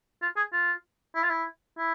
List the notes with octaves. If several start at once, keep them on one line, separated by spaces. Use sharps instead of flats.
F4
G#4
F4
E4
F4
E4
E4